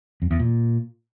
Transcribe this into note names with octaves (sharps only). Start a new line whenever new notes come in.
F2
E2
A#2